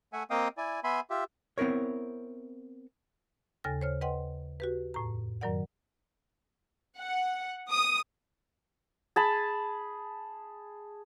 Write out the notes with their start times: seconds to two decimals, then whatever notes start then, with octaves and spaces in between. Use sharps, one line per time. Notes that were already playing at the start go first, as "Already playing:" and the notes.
0.13 A3 E5 F#5 G#5
0.30 A#3 C4 D#5 F5 G5 D#6
0.57 E4 D5 G#5
0.84 B3 E5 G#5 B5 C6
1.10 F4 G4 E5
1.58 B3 C4 E4 A#4 C#5
3.64 D#2 C#3 A4 G#5 A6 A#6
3.81 C5 C#5 F6
4.01 B4 D#5 F#5 G5 C6
4.60 F#4 G4 B4
4.94 F2 A2 A#5
5.41 F#2 D#3 F#3 A#4 D5 F#5
6.98 F#5
7.70 D#6
9.16 G#4 A5 B5